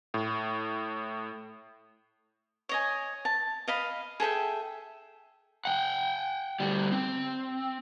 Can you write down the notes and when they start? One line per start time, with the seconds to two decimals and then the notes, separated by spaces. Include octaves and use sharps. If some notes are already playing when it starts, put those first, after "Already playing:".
0.14 A2
2.69 C#5 D#5 G#5
3.25 A5
3.67 D#5 F5 B5
4.20 G#4 A4 E5 G5
5.65 F#5 G5
6.60 D2 G3
6.92 C4